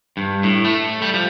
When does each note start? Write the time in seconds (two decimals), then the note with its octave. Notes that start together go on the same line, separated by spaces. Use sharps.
0.17 G2
0.43 A2
0.65 A3
1.02 G3
1.14 F3